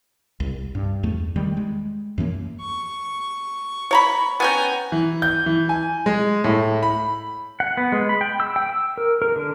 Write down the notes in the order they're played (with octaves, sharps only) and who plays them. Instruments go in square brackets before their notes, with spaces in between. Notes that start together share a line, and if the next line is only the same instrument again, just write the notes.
[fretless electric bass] C2
G2
E2 A3
D#3 G3
G#3
F#2 E3 F#3 A#3
[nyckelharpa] C#6
[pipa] C#5 A#5 B5
[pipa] B3 C#4 G5 [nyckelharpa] G#5 A#5
[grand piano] E3
G6
E3
G#5
G#3
A2
B5
[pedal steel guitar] F#5
B3
G#3
B5
G5
E6
G5
E6
A#4
A#4
D3